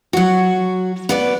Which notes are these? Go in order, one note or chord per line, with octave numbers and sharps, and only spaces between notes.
F#3 F#4
B3 B4 D5